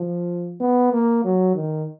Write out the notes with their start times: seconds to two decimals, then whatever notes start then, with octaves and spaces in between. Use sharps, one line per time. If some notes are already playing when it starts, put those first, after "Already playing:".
Already playing: F3
0.60 B3
0.92 A#3
1.24 F#3
1.55 D#3